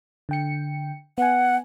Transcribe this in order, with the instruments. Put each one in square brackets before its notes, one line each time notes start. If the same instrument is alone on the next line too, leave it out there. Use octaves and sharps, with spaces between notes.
[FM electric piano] D3 G5 C#7
[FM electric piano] B3 G#5 [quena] F#5